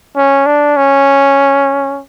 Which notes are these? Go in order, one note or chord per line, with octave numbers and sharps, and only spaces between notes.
C#4
D4
C#4